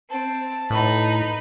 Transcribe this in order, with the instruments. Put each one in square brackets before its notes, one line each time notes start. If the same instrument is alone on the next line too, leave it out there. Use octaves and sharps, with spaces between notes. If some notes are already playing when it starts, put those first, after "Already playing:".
[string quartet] C4 [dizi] A5
[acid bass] A2 [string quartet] D#4 B4